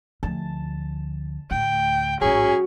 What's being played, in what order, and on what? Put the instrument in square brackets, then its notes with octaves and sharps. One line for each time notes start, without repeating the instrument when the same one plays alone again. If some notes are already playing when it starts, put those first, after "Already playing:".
[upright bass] D2 F3 [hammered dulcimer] A5
[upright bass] D2 A2 [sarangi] G5
[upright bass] A1 G#2 [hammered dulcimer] F#3 [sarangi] C#4 [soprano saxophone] G#4